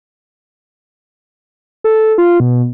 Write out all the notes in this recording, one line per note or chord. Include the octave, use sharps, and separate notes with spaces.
A4
F4
B2